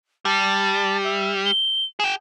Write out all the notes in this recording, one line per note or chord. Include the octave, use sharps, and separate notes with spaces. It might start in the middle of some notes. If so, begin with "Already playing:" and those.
G3 A5
E5
G7
G#4 G5 E7